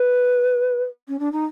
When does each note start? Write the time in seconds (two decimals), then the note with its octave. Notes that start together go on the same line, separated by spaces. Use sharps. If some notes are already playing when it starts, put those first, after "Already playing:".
Already playing: B4
1.08 C#4
1.19 D4
1.32 D#4